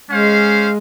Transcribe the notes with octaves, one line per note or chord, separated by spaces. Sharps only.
G#3 C#4 C5 F5